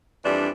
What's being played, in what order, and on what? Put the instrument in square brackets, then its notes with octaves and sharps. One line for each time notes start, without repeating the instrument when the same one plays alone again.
[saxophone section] F2 E3 G3 D4